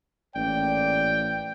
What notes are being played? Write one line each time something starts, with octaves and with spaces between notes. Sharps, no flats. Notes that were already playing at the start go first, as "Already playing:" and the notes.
A1 G#2 A#3 D5 G5